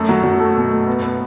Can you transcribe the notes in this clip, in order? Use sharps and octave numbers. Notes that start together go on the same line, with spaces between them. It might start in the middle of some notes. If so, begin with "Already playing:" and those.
Already playing: F#2 A3
F#3
F#3
A3
B2
A3
B3
B3